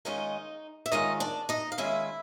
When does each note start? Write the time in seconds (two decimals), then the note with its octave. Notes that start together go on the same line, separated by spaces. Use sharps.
0.05 D#3 G#3 C#4 D#4 F4 D#5
0.86 E5
0.92 D#3 G#3 C#4 D#4 F4 D#5
1.20 D4 D5
1.49 D#4 D#5
1.72 F5
1.78 D#3 G#3 C#4 E4 F4 E5